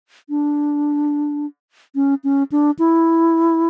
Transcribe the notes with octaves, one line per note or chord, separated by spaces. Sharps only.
D4
C#4
C#4
D4
E4